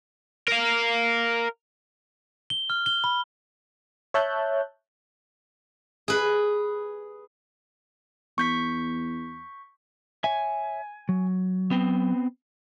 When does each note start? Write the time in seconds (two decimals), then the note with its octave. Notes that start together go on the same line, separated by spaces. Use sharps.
0.48 A#4 F5
2.50 G7
2.70 F6
2.86 G7
3.04 B5
4.14 C#5 E5 A5 F#6 G6
6.08 G#4 B4
8.38 E2 C#6 G6 B6
10.24 C#5 E5 G#5
11.09 F#3
11.71 B3 C4